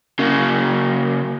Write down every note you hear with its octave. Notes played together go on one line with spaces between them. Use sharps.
C#3 A#3